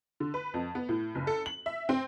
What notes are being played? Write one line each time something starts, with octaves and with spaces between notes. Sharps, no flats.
D3
B4
F2
B3
A2
F#1
A4
F#7
E5
C4